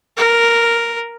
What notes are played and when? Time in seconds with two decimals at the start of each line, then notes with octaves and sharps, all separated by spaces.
0.17 A#4